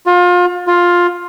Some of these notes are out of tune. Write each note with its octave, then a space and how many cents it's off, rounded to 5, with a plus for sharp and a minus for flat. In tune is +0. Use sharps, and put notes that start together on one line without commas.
F4 +30
F4 +10